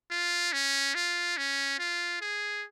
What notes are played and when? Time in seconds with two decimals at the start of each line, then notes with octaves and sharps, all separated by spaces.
0.11 F4
0.53 C#4
0.95 F4
1.37 C#4
1.79 F4
2.21 G#4